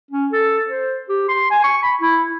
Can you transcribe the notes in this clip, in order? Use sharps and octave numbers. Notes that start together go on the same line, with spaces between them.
C#4
A4
C5
G4
C6
G#5
C#6
B5
E4